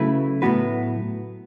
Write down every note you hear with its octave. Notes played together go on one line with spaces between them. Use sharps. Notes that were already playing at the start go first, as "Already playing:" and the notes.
Already playing: C#3 F#3 A3 E4 B4
A2 F#3 B3 F#4 B4